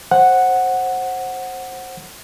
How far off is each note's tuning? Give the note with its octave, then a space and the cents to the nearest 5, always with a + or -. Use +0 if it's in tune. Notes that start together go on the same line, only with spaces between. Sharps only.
C5 +20 F#5 +0